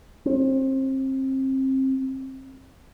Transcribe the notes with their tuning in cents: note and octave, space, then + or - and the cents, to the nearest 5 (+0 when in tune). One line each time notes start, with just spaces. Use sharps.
C4 +30